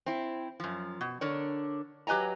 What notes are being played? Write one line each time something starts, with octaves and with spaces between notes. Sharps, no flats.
C4 E4
F#2 F3
B2
D3 D4 A#4 C#5
F#3 G4 B4 D#5 G#5 A#5